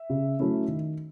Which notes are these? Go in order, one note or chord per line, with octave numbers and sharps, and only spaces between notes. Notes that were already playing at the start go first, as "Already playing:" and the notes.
Already playing: E5
C#3
F#3 A3 C#4 E4
D#3